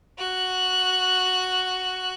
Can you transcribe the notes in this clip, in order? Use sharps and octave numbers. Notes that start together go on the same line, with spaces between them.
F#4 F#6